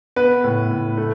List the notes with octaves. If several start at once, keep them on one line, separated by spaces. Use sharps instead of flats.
B3 B4
A2
A2
A3